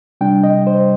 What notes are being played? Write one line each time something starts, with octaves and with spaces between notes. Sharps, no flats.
C3 G3 D4 G5
D#5
C5